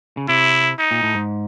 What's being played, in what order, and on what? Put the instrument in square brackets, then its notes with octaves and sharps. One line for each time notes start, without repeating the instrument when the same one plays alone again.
[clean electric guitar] C#3
[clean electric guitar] C3 [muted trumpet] E4
[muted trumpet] D#4
[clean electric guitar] A#2
A2
G#2